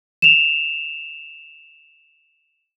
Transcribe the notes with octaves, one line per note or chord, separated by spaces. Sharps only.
E7 F7